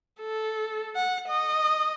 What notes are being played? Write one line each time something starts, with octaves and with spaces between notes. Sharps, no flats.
A4
F#5
D#5